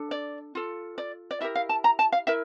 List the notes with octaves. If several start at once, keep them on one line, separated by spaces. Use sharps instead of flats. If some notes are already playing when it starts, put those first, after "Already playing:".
Already playing: D4 A4
D5
F4 A4
D5
D5
E4 G4 A#4 E5
F5
A5
A#5
A5
F5
E4 A#4 E5